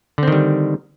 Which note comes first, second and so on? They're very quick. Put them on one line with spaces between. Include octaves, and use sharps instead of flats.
D3 C4 D#3 G3